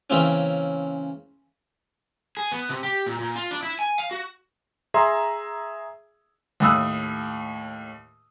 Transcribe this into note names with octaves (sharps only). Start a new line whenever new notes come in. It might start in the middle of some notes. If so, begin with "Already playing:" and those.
C#3 E3 A#3 C4 C#4
G#4
B3
C3
G4
A#2
A#2
F4
D4
E4
G#5
F5
F#4
G#4 E5 A#5 C6
D#2 A2 D#6 E6 F#6